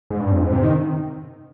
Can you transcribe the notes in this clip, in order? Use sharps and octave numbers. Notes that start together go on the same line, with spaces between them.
G#2
G2
F2
G#2
C3
D#3